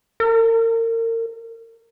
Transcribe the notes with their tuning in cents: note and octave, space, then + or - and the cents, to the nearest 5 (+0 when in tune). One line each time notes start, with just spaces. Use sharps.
A#4 -35